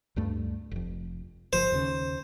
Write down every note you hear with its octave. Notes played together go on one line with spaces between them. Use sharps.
D2 G2 A3
F1 F2
G1 F3 C5
D#2 C#3